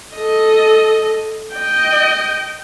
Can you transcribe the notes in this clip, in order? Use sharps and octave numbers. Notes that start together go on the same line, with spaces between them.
A4 D#5
D#5 G5